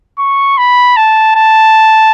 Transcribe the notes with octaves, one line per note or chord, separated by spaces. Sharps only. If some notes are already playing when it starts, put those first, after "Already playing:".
C#6
B5
A5
A5